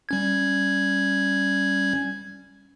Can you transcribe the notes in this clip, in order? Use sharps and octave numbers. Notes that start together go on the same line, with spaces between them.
G3 C#4 G#6